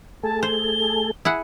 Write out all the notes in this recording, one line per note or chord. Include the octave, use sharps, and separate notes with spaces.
A3 G#4 A4 A5
C5 G7
E4 G#4 F#5